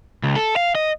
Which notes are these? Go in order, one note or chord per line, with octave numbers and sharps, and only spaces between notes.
C#2
A4
F5
D#5